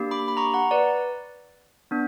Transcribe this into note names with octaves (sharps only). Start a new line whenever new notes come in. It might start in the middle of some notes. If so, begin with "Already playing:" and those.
Already playing: A#3 D4 G4
B5 D6
B5
A#5 C#6
F#5 A#5
B4 D5
B3 D4